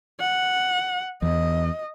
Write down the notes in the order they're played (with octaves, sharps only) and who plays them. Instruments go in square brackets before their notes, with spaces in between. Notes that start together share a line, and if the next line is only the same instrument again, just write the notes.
[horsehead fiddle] F#5
[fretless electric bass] E2 [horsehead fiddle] D#5